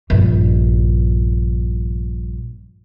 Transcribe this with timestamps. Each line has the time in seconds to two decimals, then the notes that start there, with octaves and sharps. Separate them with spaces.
0.10 A#1 G2